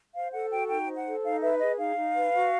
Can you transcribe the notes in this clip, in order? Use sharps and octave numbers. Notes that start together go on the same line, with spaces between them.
C5 F5
A4 F#5
F#4 G5
D#4 G5
C5
F#5
A4
D#4 F5
B4 E5
G#4 D#5
D#4 F5
D#4
B4
F#4